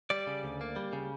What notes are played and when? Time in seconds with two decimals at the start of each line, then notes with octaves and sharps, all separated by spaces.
0.10 G3 D5
0.27 C#3
0.44 D2
0.61 A#3
0.76 G3
0.93 C#3